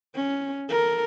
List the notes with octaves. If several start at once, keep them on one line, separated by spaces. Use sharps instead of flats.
C#4
A4 A#4